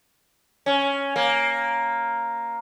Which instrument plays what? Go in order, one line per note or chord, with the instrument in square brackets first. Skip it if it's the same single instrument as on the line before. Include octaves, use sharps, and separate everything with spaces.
[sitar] C#4
A#3